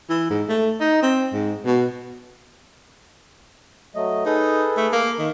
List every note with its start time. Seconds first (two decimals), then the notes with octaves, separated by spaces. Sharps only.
0.09 E3
0.30 G#2
0.49 A3
0.80 D#4
1.02 C4
1.33 G#2
1.66 B2
3.95 F#3 A3 D#5
4.26 D#4 G#4 A4 B4
4.77 A3
4.93 A#3
5.19 D#3